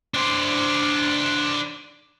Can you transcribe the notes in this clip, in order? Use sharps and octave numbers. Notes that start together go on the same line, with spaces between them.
D4 C5